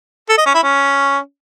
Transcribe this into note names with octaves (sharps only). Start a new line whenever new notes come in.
A4
D#5
C#4
E4
C#4